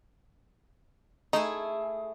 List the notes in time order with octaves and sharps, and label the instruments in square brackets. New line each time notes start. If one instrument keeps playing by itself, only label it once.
[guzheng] A3 E4 G#4 [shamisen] D#4